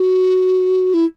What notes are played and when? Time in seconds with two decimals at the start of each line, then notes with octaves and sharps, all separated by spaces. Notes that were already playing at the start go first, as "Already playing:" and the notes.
Already playing: F#4
0.94 E4